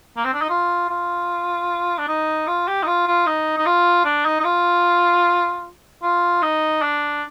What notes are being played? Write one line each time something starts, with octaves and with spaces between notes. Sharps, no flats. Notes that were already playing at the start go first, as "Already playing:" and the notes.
A#3
C4
D4
D#4
F4
F4
D4
D#4
F4
G4
D#4
F4
F4
D#4
D#4
F4
D4
D#4
D#4
F4
F4
D#4
D4